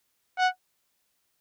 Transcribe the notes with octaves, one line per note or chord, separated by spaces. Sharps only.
F#5